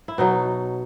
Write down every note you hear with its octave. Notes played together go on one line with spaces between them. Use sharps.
E4
B2 F#3 D#4